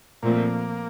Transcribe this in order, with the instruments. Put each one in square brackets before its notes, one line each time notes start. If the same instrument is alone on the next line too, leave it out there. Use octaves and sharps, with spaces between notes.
[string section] A#2 F3 A3 C4 [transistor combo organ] A#3